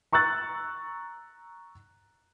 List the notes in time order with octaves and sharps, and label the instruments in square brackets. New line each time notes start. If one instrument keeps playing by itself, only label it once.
[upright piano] A#5 C#6 E6 F#6 A6